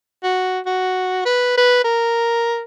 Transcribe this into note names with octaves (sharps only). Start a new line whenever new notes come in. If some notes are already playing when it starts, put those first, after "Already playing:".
F#4
F#4
B4
B4
A#4